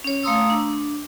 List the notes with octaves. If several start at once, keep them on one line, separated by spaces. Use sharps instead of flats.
C#4 C#5
A3 F5 A#5 C6 D#6 E6
D4